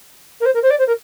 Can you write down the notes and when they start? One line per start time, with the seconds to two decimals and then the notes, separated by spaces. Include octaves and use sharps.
0.40 A#4
0.45 C5
0.54 A#4
0.62 C5
0.70 D5
0.79 C5
0.87 A#4